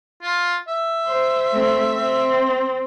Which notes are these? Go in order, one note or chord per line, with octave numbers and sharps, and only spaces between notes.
F4
E5
C5
A3 C4
C4